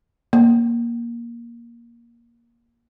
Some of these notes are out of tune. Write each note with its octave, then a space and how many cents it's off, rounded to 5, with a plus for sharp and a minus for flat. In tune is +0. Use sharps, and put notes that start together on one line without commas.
A#3 +10